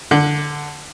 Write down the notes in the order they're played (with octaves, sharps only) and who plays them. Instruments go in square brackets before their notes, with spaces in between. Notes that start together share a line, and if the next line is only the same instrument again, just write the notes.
[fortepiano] D3